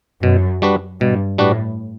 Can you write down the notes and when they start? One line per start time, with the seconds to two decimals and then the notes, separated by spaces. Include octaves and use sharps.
0.23 F#2 B2
0.62 G3 D4 F#4 B4
1.01 G2 B2
1.38 A2 G3 D4 F#4 B4